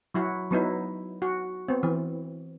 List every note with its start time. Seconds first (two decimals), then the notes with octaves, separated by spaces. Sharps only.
0.14 F#3 E4 F#4
0.51 F#3 B3 D#4 E4
1.22 F#4
1.68 B3 C4
1.83 E3